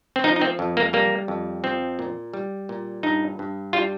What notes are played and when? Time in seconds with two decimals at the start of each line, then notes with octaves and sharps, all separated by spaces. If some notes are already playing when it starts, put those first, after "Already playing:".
0.16 C4
0.24 F3 D#4
0.36 D#4
0.41 C4
0.59 F2
0.77 A#3
0.93 G3 A#3
1.28 F2
1.64 F3 C4
1.99 A#2
2.34 G3
2.69 A#2
3.03 G2 D#4
3.39 G2
3.73 G3 F4